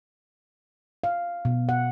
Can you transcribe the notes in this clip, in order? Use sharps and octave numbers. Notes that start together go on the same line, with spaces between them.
F5
B2
F#5